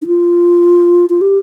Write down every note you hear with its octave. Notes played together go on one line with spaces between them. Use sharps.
D#4
F4
F4
G4